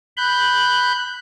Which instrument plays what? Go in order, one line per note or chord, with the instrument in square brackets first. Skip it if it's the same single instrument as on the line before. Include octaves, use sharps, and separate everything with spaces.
[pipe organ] B5 F#6 G6